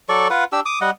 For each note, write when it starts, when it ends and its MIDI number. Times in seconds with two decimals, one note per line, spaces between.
0.09 0.28 54
0.09 0.28 69
0.09 0.28 74
0.09 0.28 85
0.30 0.44 65
0.30 0.44 71
0.30 0.44 78
0.52 0.60 62
0.52 0.60 67
0.52 0.60 88
0.65 0.79 86
0.65 0.79 87
0.81 0.90 55
0.81 0.90 75
0.81 0.90 78